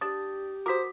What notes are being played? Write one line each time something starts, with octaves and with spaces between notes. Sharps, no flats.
D4 G4 D#6 A6
F#4 A#4 C5 D6 D#6 B6